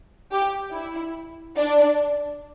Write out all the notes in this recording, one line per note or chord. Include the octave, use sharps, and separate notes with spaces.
G4
E4
D4